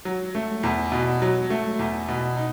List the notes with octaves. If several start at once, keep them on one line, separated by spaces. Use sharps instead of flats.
F#3
A3
E2
B2
F#3
A3
E2
B2
D#4